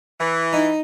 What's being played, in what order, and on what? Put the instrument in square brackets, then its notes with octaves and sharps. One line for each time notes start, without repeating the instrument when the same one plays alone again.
[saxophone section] E3
[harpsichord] D#4